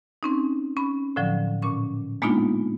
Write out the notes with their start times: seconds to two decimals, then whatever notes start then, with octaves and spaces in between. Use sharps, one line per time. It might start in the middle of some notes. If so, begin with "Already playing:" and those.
0.23 C4 C#4 D#4
0.77 C#4 B5
1.16 A2 D3 F3 F#3
1.62 A#2 C#4 C#6
2.22 G#3 A#3 B3 D4 D#4 F4